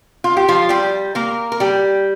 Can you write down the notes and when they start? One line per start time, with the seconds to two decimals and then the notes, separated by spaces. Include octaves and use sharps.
0.24 F4
0.37 G4
0.48 F3 F4
0.69 G3 G4
1.15 A#3 A#4
1.52 A#4
1.60 G3 G4